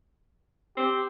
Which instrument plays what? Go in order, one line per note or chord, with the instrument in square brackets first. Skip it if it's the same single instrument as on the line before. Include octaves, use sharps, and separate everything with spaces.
[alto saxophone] C4 [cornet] G4